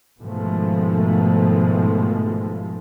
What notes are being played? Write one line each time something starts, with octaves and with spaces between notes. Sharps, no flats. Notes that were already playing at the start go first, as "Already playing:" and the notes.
G#2 B2 D#3 F3 G#3 A3